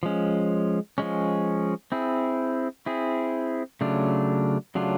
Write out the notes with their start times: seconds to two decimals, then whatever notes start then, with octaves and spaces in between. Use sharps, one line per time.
0.03 F3 G#3 C#4
0.98 F3 G#3 C#4
1.92 C4 E4 G#4
2.86 C4 E4 G#4
3.81 C#3 F#3 A3 D4 F4
4.75 C#3 F#3 A3 D4 F4